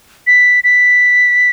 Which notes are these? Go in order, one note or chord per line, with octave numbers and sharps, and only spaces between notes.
B6
B6